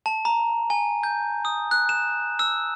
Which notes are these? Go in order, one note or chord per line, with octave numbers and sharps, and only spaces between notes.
A5
A#5
G#5
G6
D#6
F#6
E7
E6